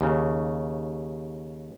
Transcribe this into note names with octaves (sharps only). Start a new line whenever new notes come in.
D#2 C#3